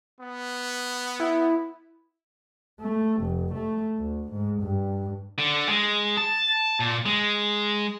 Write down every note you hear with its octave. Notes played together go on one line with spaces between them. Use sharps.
B3
E4
A3
F1
A3
D2
G#2
G2
D3
G#3
A5
A#2
G#3